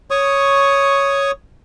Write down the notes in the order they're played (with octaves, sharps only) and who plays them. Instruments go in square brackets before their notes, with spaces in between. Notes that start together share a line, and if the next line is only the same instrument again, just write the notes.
[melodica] C#5 C#6 D#6